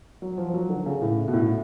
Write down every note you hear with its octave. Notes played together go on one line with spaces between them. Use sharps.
F#3
F3
F3
F#3
D3
C#3
A2
C#3
B2
A2